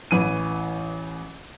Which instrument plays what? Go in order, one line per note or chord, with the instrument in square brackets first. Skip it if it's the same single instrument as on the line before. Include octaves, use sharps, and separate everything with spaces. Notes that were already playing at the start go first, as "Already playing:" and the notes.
[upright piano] A1 E3 D#7